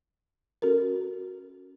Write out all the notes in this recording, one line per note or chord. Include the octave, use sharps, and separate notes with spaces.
C#4 F#4 A4 A#4